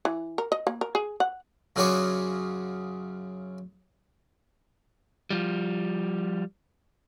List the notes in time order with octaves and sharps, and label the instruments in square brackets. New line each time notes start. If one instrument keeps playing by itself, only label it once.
[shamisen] E3
A#4
D#5
A#3
A#4
G#4
F#5
[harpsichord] F#2 C#3 F#3 F4 G#4 D5
[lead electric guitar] F3 G3